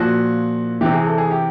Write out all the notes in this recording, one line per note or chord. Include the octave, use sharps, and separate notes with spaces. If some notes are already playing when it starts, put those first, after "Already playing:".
Already playing: A#2 F3 F#4
C3 E3 G4
G#4
A4
G#4
G4